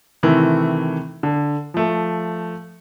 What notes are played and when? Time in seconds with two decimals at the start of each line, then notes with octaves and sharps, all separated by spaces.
0.23 C3 D#3 E3 A3 C4
1.23 D3
1.74 F3 A3